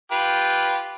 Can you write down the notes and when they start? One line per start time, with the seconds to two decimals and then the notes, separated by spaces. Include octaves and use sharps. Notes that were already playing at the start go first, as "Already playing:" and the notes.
0.11 F4 G4 B4